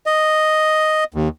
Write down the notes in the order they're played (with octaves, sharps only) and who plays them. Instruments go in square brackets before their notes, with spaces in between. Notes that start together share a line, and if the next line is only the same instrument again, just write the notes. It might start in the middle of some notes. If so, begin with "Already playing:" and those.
[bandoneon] D#5
D#2